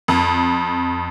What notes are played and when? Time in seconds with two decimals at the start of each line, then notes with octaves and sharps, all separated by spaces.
0.08 F2